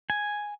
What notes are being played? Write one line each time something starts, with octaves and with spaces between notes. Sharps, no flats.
G#5